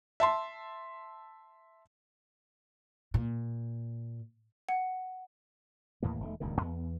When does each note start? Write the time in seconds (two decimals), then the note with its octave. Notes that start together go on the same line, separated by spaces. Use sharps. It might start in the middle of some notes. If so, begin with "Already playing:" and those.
0.20 E5 A5 C6
3.14 A#2
4.69 F#5
6.03 D#2 A2 E3 A#3
6.20 E1 D#3 A3
6.40 D#1 C#2 G2 D#3
6.61 E2 B3